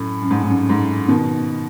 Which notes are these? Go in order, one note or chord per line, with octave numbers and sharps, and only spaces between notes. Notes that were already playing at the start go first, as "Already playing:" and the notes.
Already playing: F#2 A2
F#2
G#2
G#2
F#2
G#2
B2 D#3